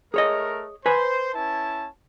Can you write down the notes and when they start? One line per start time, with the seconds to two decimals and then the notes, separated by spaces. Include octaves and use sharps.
0.14 A3 G#4 A#4 C#5 D#5
0.86 B4 C5 G#5
1.35 C#4 E4 A5